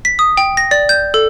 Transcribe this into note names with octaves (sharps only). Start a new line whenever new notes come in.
B6
D#6
G5
A#6
D5
G6
A4